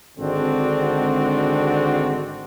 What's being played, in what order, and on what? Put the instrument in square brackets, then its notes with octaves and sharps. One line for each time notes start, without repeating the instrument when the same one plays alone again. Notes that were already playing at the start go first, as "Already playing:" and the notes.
[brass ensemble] G#1 D3 G#3 C4 D4 F#4